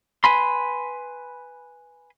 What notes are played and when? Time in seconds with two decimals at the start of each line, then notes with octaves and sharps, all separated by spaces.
0.24 B4 G#5 B5 C6